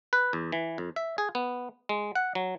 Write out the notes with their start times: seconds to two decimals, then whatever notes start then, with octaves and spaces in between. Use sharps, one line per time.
0.13 B4
0.33 E2
0.52 E3
0.78 F2
0.96 E5
1.18 G#4
1.35 B3
1.89 G#3
2.15 F#5
2.35 F#3